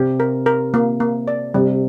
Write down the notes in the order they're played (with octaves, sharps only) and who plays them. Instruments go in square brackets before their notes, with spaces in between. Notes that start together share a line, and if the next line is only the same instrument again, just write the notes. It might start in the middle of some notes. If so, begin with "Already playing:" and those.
Already playing: [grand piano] C3 [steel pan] G4
[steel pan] A#4
A#4
A#3
A#3
D5
[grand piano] C3 [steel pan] G3